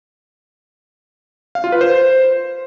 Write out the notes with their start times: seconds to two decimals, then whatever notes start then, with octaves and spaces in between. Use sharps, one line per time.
1.55 F5
1.64 F4
1.72 B4
1.81 C5